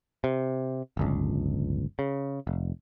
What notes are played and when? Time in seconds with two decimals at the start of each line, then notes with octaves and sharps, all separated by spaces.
0.24 C3
0.97 D1 G1 C#2
1.99 C#3
2.47 F1